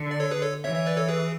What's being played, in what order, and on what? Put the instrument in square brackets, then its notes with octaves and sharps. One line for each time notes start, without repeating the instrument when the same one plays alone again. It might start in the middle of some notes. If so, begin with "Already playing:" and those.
Already playing: [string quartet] D3
[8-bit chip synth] D5
A4 C#5
G#4 B4
A4 C#5
[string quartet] E3 [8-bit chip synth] C#5 E5
[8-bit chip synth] C#5 E5
B4 D5
A4 C#5
G#4 B4